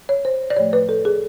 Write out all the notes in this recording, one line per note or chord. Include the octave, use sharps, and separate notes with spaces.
C#5
C5
D5
A2 F3 A3 C#5
B4
A4
G#4